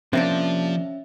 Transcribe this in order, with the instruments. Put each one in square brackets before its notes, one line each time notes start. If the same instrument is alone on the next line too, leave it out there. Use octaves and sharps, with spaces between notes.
[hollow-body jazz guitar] C3 A#3 D4 [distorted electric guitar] F3 [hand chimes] C#4 E5